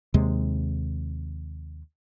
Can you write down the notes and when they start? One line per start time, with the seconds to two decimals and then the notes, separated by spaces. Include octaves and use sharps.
0.14 D#2 C3 G#3